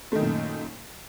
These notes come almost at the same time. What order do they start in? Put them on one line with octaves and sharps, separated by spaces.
A3 D#3 F#2 A#2